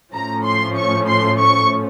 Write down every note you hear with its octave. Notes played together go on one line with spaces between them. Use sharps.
A2 F3 A3 C#4 A#5
C6
C#6
C6
C#6